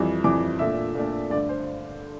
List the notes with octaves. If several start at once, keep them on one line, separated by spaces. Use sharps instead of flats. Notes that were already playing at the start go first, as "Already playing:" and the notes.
Already playing: F2 E3 G3
F2 E3 G3 D6
A#2 A3 D4 E5
A#2 A3 D4
G2 D3 A3 D5
C5